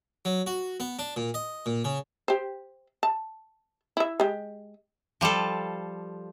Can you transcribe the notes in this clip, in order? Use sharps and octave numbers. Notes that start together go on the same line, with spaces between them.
F#3
F#4
B3
D4
A#2
D#5
A#2
C#3
G4 C5
A5
E4 E5
G#3 G4
F3 G3 F4 A4